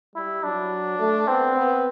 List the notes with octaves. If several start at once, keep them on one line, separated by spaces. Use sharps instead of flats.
G3 E4
F#3 D4
A3
B3 C4
B3